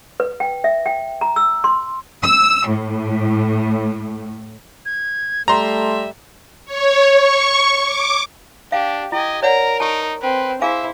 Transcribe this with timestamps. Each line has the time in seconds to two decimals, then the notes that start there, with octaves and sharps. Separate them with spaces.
0.20 B4
0.40 G5
0.64 E5
0.86 G5
1.21 A#5
1.36 E6
1.64 C6
2.23 E6
2.68 A2
4.85 G#6
5.48 G3 A3 E5 A#5 C6
6.65 C#5
7.17 C#6
7.84 D6
8.72 D4 G4 F5
9.12 E4 G4 D#5 G#5
9.43 A#4 C#5 D5 F#5 A#5
9.80 D#4 G4 A5
10.22 C4 B4
10.62 E4 G#4 C5 E5 F5 G#5